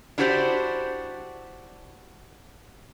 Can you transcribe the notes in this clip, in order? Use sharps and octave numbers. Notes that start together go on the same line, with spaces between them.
D4 E4 F#4 G4 C5 D5